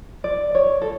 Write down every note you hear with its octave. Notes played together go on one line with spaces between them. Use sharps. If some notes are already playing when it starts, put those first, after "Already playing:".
D5
C#5
A4